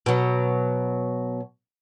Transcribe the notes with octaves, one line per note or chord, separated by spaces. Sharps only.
B2 F#3